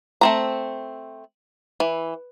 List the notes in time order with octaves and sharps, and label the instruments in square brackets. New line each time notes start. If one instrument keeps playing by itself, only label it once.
[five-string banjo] A3 C4 A#5
E3